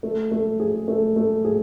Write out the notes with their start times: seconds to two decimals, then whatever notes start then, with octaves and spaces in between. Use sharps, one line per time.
0.03 A3
0.31 A3
0.60 G#4
0.88 A3
1.16 A3
1.45 G#4